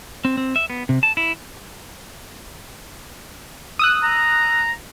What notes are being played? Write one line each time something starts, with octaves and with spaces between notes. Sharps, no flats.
C4
C4
E5
B3
C3
A5
E4
D#6 E6 F#6
A#5